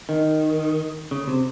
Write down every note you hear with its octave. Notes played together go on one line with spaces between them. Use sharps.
D#3
C#3
C3